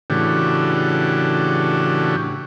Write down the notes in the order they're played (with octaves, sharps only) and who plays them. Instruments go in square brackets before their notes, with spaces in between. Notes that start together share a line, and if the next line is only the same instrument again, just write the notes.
[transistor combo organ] A2 C#3 E3 D4 F#4 G4